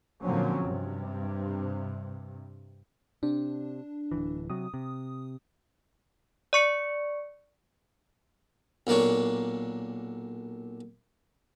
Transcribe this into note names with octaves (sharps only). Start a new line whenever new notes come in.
A#2 D3 F3 F#3 C4 C#4
G2 C3
C3 D4
D1 C2 E3
C3 F#3 D#6
C3
D5 C#6 C#7
B1 A#2 A#3 D4 C#5